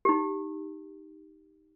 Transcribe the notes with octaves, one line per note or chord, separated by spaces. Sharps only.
D#4 G4